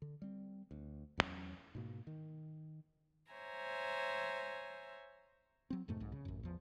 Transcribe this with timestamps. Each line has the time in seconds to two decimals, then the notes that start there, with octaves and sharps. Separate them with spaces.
0.02 D3
0.22 G3 C4
0.71 D2
1.17 E2 G2 F#3 C#4
1.75 G#2 B2 A#3
2.07 D#3
3.33 C5 C#5 E5 G#5 A#5
5.70 F#3 C4
5.88 F2 G#2 B2 A3
6.00 B1 G#2
6.12 C#3
6.25 A1 F#2
6.43 E2 F3